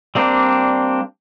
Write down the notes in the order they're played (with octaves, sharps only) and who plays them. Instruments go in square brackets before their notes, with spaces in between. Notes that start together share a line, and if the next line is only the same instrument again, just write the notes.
[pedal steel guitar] G3 A#3 C4 D4